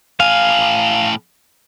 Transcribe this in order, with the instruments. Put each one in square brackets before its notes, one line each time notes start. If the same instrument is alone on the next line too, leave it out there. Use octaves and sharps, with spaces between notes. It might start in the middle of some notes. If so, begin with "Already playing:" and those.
[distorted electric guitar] A2 G#5 [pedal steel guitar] F5